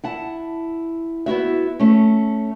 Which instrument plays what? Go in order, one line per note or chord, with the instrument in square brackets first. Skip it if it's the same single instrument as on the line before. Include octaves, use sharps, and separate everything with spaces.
[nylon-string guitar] E4 F#5 A5
B3 E4 F#4 E5
A3 C#4